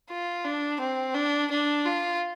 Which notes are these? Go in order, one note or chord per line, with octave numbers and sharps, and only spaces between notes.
F4
D4
C4
D4
D4
F4